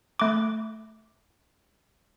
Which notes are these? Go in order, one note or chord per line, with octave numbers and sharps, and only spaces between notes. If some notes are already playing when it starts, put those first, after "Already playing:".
A3 D6